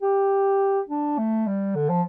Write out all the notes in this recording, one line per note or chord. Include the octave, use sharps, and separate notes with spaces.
G4
D4
A3
G3
D3
F3